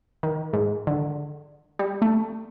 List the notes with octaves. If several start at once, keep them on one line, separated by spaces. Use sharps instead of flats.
D#3
G#2
D3
G3
A3